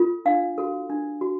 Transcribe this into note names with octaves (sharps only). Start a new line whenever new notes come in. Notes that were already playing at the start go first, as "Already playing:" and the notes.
Already playing: F4 A4
D4 F5
F#4 A4
D4
F#4